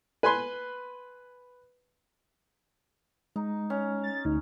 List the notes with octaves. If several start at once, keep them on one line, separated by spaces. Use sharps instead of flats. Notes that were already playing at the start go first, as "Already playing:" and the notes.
B4 G#5 B5 C6
G#3 D#4
C#4
A6
D2 D#4